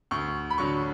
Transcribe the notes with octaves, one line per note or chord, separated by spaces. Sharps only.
D2 C#6
B5
D3 F#3 C#6